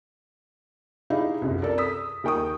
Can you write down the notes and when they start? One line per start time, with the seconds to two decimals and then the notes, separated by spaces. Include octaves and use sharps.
1.10 D#4 E4 G4 G#4 F5
1.42 C2 F#2 C3
1.62 A4 A#4 D5
1.78 D#6 E6 B6
2.24 D#2 A#4 G5 C#6 D#6